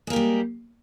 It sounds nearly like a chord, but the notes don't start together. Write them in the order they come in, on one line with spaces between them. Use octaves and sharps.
G#3 A#3 G4 G3